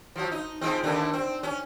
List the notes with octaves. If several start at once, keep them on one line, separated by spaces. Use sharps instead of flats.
F3 F#3
D#4
F3 G#3 C4
D#2 D3 D4
C4
C#4